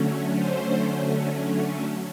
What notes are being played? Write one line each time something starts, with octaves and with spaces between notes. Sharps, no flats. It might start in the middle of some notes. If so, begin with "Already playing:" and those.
Already playing: D3 F#3 A3 C#4
C5